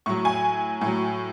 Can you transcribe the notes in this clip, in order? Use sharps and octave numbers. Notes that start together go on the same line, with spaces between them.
A2 F#3 C#6
G#5
A2 F#3